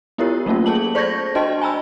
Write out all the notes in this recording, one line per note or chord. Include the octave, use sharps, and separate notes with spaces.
B3 E4 F4 G4 A#4 C#5
F#3 A3 A#3 C#4 F4
G#4 A4 A5 F#7
C5 D5 C#6 G6 G#6 A#6
D4 F#4 D#5 G5 A5 C6
G#5 A#5 B5 E6